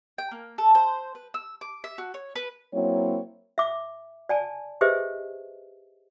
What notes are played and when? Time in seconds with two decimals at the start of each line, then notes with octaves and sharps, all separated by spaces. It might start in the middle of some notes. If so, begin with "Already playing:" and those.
0.18 G5
0.31 A#3
0.58 A4
0.75 C5
1.15 B4
1.34 E6
1.61 D6
1.84 E5
1.98 F#4
2.14 C#5
2.36 B4
2.74 F#3 A#3 C4 E4 C#5
3.58 E5 D6
4.29 D5 G#5 A5
4.81 G4 G#4 B4 C5 D#5 E5